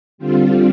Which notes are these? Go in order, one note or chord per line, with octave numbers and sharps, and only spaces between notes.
D3 G3 C4 F4